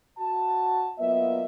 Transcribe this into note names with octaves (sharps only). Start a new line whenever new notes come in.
F#4 A5
F#3 A#3 B3 F4 D#5 E5